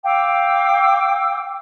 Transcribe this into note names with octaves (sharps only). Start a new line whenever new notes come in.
F5 G5 D6 E6